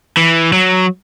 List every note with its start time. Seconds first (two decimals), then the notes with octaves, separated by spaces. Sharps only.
0.17 E3
0.53 F#3